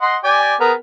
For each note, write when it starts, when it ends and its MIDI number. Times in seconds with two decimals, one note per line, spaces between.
0.01 0.17 75
0.01 0.17 78
0.01 0.17 84
0.24 0.55 67
0.24 0.55 74
0.24 0.55 80
0.60 0.73 59
0.60 0.73 68
0.60 0.73 70